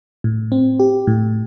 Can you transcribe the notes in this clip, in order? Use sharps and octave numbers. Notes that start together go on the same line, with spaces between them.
A2
C4
G4
A2